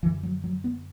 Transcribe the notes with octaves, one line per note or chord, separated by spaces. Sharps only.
F#2 D3 E3
F#3
F#3
B3